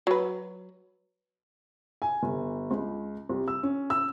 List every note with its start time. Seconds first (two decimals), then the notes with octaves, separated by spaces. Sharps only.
0.07 F#3 B4
2.02 G#5
2.23 G1
2.71 C#2
3.29 C2
3.48 E6
3.63 C#4
3.90 E6